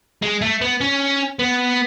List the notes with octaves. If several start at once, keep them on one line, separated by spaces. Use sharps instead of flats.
G#3
A3
B3
C#4
B3